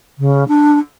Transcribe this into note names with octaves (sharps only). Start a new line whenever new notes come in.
C#3
D4